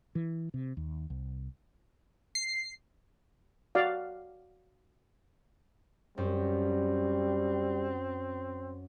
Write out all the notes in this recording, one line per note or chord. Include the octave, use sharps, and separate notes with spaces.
E3
C3
D#2
C2
C7
F#4 D5 F5
F#2 G3 C4